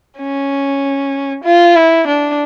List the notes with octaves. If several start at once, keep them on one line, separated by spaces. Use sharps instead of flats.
C#4
F4
E4
D4